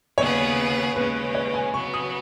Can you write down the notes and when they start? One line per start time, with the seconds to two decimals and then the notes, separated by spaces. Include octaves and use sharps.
0.17 D#2 C#3 B3 G#4 B4 C#5
0.96 D#2 C#3 G#3 C#4 B4
1.35 C#5
1.54 G#5
1.74 C#3 F#3 B3 C#6
1.94 D#6